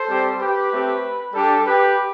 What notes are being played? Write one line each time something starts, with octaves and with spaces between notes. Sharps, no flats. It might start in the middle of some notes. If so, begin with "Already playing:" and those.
Already playing: A4 C5
G3 C4 G4
G4 B4
A3 C4 G4
G3 D4 G4 A4
G4 B4